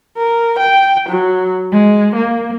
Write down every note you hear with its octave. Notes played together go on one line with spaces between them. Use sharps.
A#4
G5
F#3
G#3
A#3